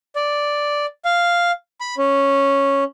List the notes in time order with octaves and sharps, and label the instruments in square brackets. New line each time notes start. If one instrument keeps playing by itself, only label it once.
[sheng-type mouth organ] D5
F5
B5
C#4